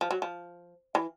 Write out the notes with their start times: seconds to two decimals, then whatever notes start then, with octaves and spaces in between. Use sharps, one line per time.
0.01 F3
0.11 F#3
0.22 F3
0.95 E3